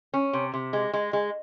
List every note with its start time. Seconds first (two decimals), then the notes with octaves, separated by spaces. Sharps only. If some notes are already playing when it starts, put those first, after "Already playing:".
0.14 C#4
0.33 C3
0.54 C3
0.73 G#3
0.93 G#3
1.13 G#3